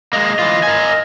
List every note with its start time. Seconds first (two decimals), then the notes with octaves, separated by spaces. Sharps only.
0.13 G#3 A#3 D#5
0.39 E3 F4
0.63 A#4 G#5